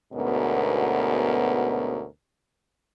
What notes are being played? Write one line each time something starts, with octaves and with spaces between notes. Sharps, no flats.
D2 G#2 B2 B3 C#4 A#4